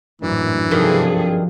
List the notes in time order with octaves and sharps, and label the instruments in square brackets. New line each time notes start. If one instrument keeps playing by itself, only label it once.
[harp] G#1 F#2 D4 [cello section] A2 [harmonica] E3
[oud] G2 D#3 [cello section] C3 G#4 A4 [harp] F3 F#4